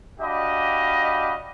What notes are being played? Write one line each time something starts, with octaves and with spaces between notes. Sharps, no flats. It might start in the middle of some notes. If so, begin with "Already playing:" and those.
D4 F#4 G4 D#5 F5 B5